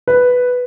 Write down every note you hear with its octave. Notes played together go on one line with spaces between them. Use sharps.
B4